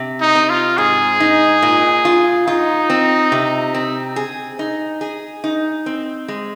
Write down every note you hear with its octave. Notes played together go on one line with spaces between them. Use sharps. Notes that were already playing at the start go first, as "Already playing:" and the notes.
Already playing: C3
D#4
C4
F4
G#2 G#4
D#4
A#2
F4
D#4 F4
C4
C3
C4
G#4
D#4
G#4
D#4
C4
G#3